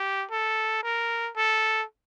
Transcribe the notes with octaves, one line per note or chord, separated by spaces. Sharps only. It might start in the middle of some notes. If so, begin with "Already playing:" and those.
Already playing: G4
A4
A#4
A4